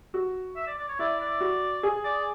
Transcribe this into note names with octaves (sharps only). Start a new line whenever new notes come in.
F#4
E5
D5
D5
C#5
E4 D5
D5
F#4
G#4
D5